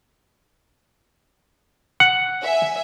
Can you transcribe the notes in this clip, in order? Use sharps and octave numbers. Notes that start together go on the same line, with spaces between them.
F#5
E5 G#5